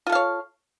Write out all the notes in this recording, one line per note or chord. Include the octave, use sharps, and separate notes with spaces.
F4 A4 C#5 F5